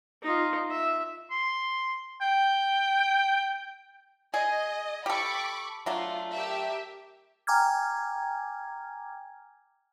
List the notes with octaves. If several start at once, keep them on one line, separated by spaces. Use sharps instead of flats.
D#4 F4
E5
C6
G5
G#4 D#5
G4 A4 B5 C#6 D6
F#3 A3 D4 F4
G4 A#4 E5
G5 G#5 A#5 D6 F6 G#6